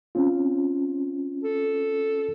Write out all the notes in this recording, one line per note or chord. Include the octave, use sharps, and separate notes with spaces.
C4 C#4 F4
A4